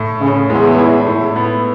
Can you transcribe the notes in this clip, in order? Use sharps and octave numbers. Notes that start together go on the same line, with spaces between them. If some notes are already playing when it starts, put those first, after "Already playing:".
Already playing: A2
C#3 C#4
E2 G#3
E4
A2
B3